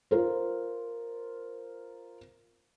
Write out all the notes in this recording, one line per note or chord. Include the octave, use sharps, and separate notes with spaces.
F4 A#4 C5